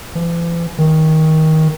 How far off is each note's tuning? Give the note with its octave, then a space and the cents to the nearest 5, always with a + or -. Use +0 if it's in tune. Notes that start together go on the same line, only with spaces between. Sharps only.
E3 +45
D#3 +20